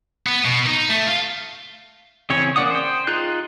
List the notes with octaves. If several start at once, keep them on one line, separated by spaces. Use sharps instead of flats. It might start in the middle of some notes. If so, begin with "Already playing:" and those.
B3
B2
D#4
A3
F4
C#3 E3 C4 C#4 C#5
A#3 C#4 D5 F#5 D#6
C5 G5
D#4 F4 G#4 F#6